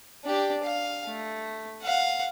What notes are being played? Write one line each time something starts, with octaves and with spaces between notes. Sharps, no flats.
D4 G4
F5
A3
F5 F#5